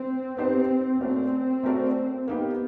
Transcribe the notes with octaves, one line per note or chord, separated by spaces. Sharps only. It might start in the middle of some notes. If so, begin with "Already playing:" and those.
Already playing: C4
B3 C4 D#4 G4 C5
A3 C4 C#4 F#4 A#4 D5
A3 C#4 F#4 A#4 D5
A#3 B3 D#4 G4